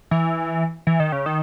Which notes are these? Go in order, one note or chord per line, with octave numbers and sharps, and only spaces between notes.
E3
E3
D#3
C#3
D#3